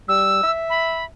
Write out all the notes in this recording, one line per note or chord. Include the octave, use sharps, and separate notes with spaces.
G3 E6
E5
B5